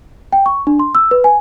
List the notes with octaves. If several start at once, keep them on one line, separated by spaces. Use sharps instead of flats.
G5
C#6
D4
C6
E6
B4
G#5